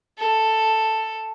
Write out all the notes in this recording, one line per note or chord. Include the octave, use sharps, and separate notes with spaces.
A4